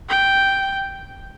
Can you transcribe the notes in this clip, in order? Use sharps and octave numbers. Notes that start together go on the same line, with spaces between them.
G5